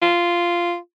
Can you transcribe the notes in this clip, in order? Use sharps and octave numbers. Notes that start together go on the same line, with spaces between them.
F4